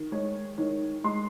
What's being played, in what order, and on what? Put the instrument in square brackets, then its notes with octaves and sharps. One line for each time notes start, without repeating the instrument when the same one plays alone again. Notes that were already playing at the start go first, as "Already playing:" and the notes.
Already playing: [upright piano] D#3
G#3 C#5
D#3 C#5
G#3 C6